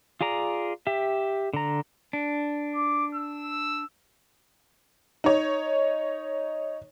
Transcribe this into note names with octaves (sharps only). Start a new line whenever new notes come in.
F4 G#4 D5 A#5
G4 E5
D3 A#5
D4
D6
E6
D#4 C#5